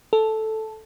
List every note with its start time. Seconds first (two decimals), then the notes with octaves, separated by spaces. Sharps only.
0.13 A4